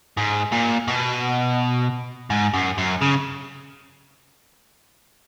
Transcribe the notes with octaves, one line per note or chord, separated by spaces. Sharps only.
G#2
A#2
B2
G#2
F#2
F#2
C#3